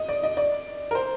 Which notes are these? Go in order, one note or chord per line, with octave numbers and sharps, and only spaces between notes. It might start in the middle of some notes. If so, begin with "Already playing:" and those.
Already playing: D#5
D5
D#5
D5
A#4
C5